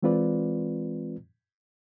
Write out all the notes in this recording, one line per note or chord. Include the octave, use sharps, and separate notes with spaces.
E3 G#3 C4 F4 B4 D5